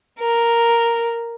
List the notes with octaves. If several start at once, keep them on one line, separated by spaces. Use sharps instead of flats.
A#4